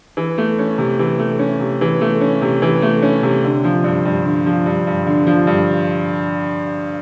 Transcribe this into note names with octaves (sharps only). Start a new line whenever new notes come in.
E3
A3
C#4
C3
E3
A3
C#4
C3
E3
A3
C#4
C3
E3
A3
C#4
C3
D3
F3
G2
G2
D3
F3
G2
G2
D3
F3
G2